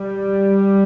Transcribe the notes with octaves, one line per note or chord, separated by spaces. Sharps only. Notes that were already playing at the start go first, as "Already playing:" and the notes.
Already playing: G3